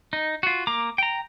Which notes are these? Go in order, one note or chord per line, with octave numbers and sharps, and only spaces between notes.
D#4
F4 F#4
A#3 A#5 D6
G5 A#5